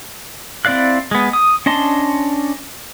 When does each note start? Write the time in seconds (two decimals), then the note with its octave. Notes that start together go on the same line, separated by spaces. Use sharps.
0.65 C4 E4 D5 F5 F#6
1.11 G#3 B3
1.33 D#6
1.66 C#4 D4 D#5 A5 C6